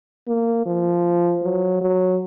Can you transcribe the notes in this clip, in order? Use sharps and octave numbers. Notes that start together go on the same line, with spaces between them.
A#3
F3
F#3
F#3